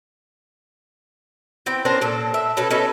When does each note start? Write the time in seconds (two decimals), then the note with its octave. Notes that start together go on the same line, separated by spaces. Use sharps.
1.66 E3 C4 G5
1.85 C#4 D4 A#4 C5
2.01 A#2 A4
2.34 E5
2.57 B2 C#4 A4 B4
2.71 C#4 D#4 A4 B4